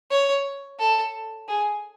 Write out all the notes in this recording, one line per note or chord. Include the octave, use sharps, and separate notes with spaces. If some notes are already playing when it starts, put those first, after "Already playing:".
C#5
A4
G#4